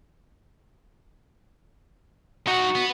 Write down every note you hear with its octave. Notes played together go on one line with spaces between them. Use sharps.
D#4 F#4 F#5
B3